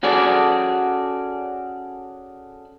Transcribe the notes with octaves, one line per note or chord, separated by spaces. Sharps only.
C#4 F#4 G#4 A4 D5